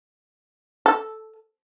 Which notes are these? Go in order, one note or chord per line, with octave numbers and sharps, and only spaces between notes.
A4